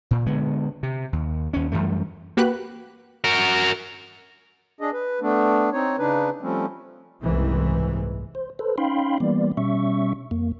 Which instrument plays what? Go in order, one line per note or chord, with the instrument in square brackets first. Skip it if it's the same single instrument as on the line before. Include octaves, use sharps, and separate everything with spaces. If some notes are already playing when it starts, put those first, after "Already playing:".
[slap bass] A#2
D3 G#3 B3
C3
D#2
D#2 C#4
F#2 E3 G3 A3
[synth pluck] A#3 F#4 G4 B4 B5 F#6
[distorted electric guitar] F#4 A#4
[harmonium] D4 G#4 D#5
B4
A3 B3 D4
C4 D#4 C#5
C#3 D4 D#4 B4
F3 G3 A3 C4 C#4
[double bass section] F#1 C2 G#2 C3 E3
[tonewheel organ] C5
A4 B4 C5
C#4 D#4 F5 G5 B5 C6
E3 G3 A#3 B3 D5
B2 G3 C#4 E5 C#6
F2 A#3